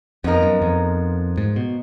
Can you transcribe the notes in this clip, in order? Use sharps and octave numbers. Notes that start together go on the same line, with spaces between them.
F2 F3 B3 D#4 A#4
F#2
F2
G#2
B2